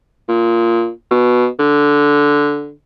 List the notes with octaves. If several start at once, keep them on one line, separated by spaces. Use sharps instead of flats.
A#2
B2
D3